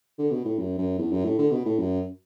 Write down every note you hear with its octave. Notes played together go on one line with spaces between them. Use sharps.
D3
B2
A2
F#2
F#2
E2
F#2
A2
D3
B2
A2
F#2